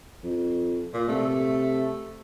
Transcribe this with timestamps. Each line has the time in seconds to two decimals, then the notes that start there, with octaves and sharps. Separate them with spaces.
0.23 F2
0.93 A#2
1.08 C3 A3